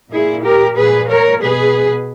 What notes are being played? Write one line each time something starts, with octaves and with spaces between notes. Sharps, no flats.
A#2 E4 G#4
G4 A#4
A#2 G#4 B4
A#4 C#5
B2 G#4 B4